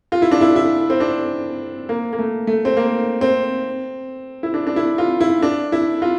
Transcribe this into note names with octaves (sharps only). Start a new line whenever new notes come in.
F4
E4
D4
E4
E4
C4
D4
A#3
A#3
A3
A3
C4
A#3
C4
E4
D4
D4
E4
F4
E4
D4
E4
F4